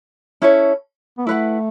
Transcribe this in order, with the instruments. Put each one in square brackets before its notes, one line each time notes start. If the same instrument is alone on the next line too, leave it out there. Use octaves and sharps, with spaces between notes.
[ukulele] C#4 E4 A4 C#5
[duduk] B3
[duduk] A3 [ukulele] E4 B4 F#5